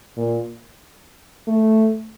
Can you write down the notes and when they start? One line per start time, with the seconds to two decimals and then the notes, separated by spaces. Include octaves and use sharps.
0.17 A#2
1.47 A3